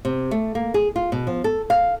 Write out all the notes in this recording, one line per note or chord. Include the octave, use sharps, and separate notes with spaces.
C3
A3
A#3
G#4
F4
B2
F3
A4
F5